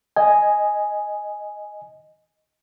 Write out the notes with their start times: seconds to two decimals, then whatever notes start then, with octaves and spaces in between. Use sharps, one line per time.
0.16 D#5 G#5